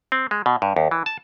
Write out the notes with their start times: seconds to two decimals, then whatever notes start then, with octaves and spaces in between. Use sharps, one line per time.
0.12 C4
0.31 G#3
0.46 B2
0.62 G2
0.76 D#2
0.91 E3
1.06 A5